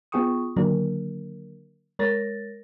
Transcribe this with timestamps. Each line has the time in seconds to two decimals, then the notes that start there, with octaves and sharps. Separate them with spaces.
0.12 B3 F4 G#4 G5 C#6 D#6
0.56 D3 D#3 F#3 A#3 D4 A#4
1.99 G#3 A#4 C#5 A6 A#6